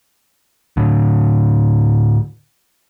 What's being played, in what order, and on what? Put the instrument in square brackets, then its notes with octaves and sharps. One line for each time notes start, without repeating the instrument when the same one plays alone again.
[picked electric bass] A2 D3